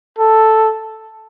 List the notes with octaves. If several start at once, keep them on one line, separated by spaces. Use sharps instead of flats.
A4